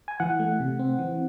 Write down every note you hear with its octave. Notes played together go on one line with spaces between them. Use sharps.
G#5
E3 F#5
A3
C3
C4
E3